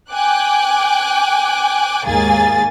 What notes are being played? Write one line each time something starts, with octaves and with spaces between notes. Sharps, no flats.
G5 G#5 D6 F#6
D#2 G#2 A#3 G#4 G#5 A6